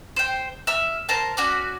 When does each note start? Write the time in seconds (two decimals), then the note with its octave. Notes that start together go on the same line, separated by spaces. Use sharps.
0.16 C5 G5
0.67 E5 F6
1.09 A#4 C5 A5
1.37 C#4 F#4 D5